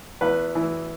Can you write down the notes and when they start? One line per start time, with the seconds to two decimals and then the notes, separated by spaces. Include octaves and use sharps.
0.21 E2 B4
0.55 E3